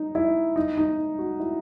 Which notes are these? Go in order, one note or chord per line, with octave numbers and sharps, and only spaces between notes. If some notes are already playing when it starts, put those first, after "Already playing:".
Already playing: D#4
E4
D#4
D#4
F#4
E4